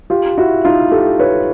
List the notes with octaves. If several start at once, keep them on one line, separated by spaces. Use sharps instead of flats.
F4 G4
E4 F#4
D#4 F4
G4 A4
B4 C#5